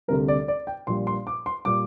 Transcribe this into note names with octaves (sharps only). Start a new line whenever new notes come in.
D2 C3 G3 A#4
D5
D5
G5
A#1 A#2 G3 C6
C6
D6
C6
A#2 G3 D6